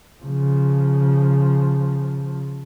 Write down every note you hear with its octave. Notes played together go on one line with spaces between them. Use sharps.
C#3 F3